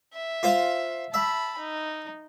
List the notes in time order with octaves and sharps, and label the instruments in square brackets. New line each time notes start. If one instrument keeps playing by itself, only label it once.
[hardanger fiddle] E5
[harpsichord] F4 C5 F5
[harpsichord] E5 [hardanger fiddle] A5 B5
[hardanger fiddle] D#4